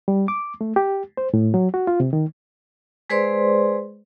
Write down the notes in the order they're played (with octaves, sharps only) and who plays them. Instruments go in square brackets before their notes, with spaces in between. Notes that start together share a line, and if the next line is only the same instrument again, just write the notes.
[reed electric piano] G3
D6
A3
G4
C5
A2
F#3
F#4
F4
C3
D#3
[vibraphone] G#3 G#4 B4 C5 D5 C6